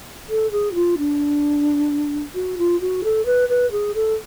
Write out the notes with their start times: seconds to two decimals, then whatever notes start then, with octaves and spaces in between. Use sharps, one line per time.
0.29 A4
0.52 G#4
0.71 F#4
0.75 F4
0.98 D4
2.35 F#4
2.58 F4
2.81 F#4
3.04 A4
3.26 B4
3.49 B4
3.71 G#4
3.95 A4